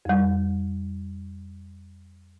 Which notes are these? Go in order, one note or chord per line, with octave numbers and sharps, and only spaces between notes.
F2 G3